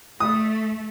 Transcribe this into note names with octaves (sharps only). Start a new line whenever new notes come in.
A3 D#6